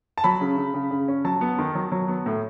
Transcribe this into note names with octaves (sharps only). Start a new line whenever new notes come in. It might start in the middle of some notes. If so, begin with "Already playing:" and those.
A5
F#3 B5
C#3
C#3
C#3
C#3
C#4
F#3 A5
B3
D#3
F#3
F#3
B3
A2